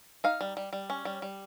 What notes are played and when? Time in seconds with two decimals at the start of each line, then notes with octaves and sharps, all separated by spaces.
0.24 D#4 F5
0.41 G3
0.57 G3
0.73 G3
0.90 C#4
1.05 G3
1.22 G3